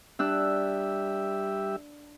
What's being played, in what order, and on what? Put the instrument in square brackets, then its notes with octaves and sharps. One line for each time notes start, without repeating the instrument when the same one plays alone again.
[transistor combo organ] G3 G4 E5 [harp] D4 E6 F#6